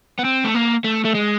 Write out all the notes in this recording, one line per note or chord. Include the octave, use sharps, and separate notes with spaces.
B3
C4
A3
A#3
A3
A3
G#3